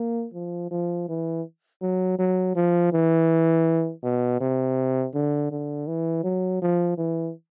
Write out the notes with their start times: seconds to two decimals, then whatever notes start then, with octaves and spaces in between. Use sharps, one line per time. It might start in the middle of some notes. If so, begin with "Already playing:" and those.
Already playing: A#3
0.34 F3
0.71 F3
1.09 E3
1.82 F#3
2.18 F#3
2.56 F3
2.92 E3
4.03 B2
4.40 C3
5.14 D3
5.51 D3
5.88 E3
6.24 F#3
6.62 F3
6.98 E3